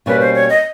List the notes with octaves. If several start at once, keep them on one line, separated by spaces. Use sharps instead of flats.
B2 G3 A#3 C#4 B4
C5
C#5
D#5